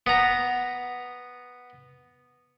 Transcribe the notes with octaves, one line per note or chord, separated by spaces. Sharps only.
B3 A#5